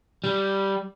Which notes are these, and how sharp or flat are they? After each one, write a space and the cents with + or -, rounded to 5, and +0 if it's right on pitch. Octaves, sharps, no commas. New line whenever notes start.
G3 -5